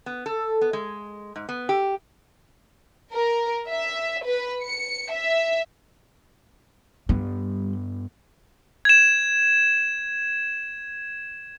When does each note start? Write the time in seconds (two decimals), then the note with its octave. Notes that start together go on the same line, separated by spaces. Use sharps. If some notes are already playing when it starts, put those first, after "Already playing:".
0.06 B3
0.26 A4
0.61 B3
0.73 G#3
1.36 G#2
1.49 B3
1.69 G4
3.13 A#4
3.71 E5
4.26 B4
4.63 C#7
5.12 E5
7.09 G2 G3 B3
8.85 G#6 E7